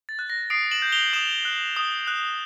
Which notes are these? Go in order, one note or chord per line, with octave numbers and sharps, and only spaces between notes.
A6
F#6
A#6
D#6 C7 D7
E7 F#7
G6
F7 G7
D#6 E7 F#7
F#6
D#6
F#6